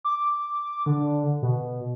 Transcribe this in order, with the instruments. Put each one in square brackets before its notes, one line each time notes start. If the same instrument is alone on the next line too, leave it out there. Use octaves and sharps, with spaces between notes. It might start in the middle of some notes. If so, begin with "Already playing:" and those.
[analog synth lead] D6
D3
B2